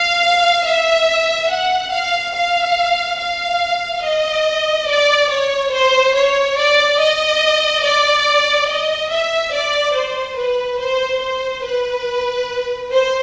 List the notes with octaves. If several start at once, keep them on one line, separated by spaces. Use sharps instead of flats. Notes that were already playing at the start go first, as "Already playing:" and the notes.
Already playing: F5
E5
F#5
F5
F5
F5
D#5
D5
C#5
C5
C#5
D5
D#5
D5
D#5
E5
D5
C5
B4
C5
C5
B4
C5